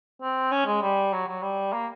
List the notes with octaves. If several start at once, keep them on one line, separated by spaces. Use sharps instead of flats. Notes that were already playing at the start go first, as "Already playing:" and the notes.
C4
C#4
G#3
G3
F#3
F#3
G3
A#3